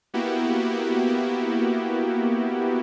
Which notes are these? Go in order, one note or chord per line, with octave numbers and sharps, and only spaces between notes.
A#3 B3 E4 F#4 G4